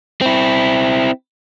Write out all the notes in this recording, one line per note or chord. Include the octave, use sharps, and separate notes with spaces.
C4 E4